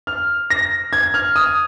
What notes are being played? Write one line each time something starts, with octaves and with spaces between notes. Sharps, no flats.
F6
A#6
G#6
F6
D#6